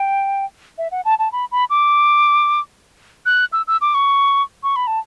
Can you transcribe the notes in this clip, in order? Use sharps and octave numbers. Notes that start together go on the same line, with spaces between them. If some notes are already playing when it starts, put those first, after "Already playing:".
Already playing: G5
E5
F#5
A5
A5
B5
B5
D6
F#6
E6
E6
D6
C#6
C#6
B5
A5